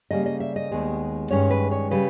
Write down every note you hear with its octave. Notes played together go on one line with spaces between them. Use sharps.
C#3 G3 A#3 D#5
D#5
E5
D#5
D#2 D#3 G#3 B3
G2 D#3 G#3 C#4 C#5
B4
C#5
C#3 G3 B4